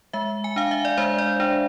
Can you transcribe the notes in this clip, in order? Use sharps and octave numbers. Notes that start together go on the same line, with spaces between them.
G#3 E5
G#5
D4 F5
E5
D5
G#3 C5
D5
D4